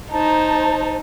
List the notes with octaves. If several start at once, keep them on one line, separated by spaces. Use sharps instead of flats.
D#4 C5 A5 A#5